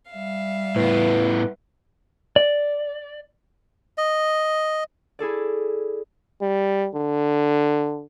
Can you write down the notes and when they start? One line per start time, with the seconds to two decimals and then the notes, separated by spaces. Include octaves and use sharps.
0.12 G3 E5 F5
0.76 A2 B3 B4
2.36 D5
3.98 D#5
5.19 E4 G#4 A4 D5
6.41 G3
6.94 D3